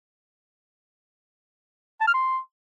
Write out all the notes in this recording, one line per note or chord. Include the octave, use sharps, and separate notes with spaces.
A5
F6
C6